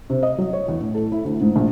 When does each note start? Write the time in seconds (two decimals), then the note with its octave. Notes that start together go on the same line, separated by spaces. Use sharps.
0.10 C3
0.23 D#5
0.38 F#3
0.53 C#5
0.68 E2
0.80 A2
0.94 A4
1.12 E4
1.24 D2
1.41 G#2
1.56 A#1